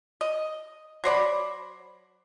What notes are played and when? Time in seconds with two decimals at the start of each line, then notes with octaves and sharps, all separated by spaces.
0.21 D#5
1.04 F#3 C5 D5 B5